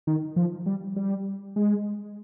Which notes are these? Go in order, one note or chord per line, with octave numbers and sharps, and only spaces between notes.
D#3
F3
G3
G3
G#3